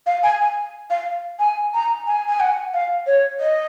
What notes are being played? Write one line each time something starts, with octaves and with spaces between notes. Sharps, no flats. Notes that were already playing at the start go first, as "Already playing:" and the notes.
F5
G#5
G#5
F5
G#5
A#5
G#5
G#5
F#5
F5
C#5
D#5